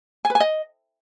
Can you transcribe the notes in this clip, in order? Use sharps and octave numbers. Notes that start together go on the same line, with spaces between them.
G#5
B4
G#5
D#5